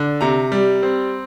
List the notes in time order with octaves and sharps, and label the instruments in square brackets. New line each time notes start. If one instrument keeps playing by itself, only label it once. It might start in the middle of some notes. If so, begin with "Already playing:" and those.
Already playing: [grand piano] D3
C3 A#5
G3
C4